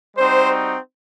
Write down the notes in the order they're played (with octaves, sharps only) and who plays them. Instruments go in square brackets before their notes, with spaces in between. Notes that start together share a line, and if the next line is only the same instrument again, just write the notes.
[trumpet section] G3 C4 D#4 F#4 C5